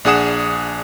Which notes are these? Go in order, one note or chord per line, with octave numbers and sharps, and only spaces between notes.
A#1 D4 G#4 F#5 D#6 E7